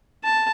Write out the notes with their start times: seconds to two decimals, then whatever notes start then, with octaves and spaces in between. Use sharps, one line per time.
0.24 A5